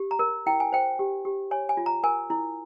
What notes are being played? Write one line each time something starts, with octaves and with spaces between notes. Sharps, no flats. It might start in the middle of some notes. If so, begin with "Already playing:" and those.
Already playing: G4
A#5
A#4
E4 G5
G#5
C5 G5
G4
G4
C#5 G#5
G#5
F4
A#5
A#4 G#5
E4